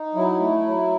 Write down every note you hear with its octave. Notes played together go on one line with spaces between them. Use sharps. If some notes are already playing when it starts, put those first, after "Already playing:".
Already playing: D#4
F#3 E4
A3
F#3